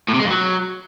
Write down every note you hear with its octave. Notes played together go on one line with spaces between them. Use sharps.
A2
C3
G#3
F2
F#3